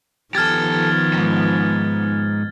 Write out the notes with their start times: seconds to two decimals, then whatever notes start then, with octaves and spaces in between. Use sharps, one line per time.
0.35 D#3 F3 B3 G4 A4 F6 G#6 A6
1.13 F2 G#2